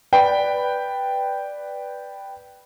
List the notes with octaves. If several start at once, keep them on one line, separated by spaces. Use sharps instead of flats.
B4 D5 G5 B5